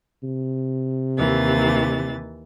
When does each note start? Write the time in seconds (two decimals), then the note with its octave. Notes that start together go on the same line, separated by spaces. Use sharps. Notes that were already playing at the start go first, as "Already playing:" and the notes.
0.23 C3
1.17 D#2 E3 A6